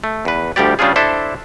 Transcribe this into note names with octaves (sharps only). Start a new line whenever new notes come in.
A3
E2 B4
D2 F3 G3 G4 D5
C#3 G3 C#4 D4 F4 G#4
D4 E4 A4 C5 E5